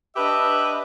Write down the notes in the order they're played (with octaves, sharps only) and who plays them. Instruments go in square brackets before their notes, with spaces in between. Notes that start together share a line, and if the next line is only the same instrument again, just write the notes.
[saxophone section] D4 G4 B4 D#5 E5